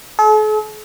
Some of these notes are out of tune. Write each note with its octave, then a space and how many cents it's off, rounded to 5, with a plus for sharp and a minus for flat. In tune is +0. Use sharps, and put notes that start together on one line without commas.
A4 -45